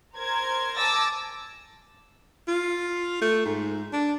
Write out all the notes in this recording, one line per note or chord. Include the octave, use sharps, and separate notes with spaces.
A#4 C5 G#6
G#5 A5 D6 E6 A6 A#6
F4
A3
G#2
D4